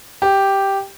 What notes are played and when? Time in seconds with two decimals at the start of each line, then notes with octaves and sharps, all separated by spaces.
0.22 G4